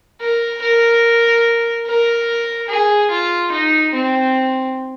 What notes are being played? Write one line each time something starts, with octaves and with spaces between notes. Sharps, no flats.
A#4
A#4
A#4
G#4
F4
D#4
C4